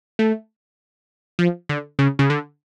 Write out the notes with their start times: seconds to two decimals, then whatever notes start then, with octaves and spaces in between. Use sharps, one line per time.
0.19 A3
1.39 F3
1.69 D3
1.99 C#3
2.19 C#3
2.30 D3